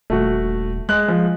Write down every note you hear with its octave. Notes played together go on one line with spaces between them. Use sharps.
D#1 A3 F#4
G#3 F#6
F3